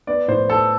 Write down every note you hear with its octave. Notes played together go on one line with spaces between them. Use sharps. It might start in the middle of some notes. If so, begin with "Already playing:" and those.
B3 D5
A2 C5
B3 A4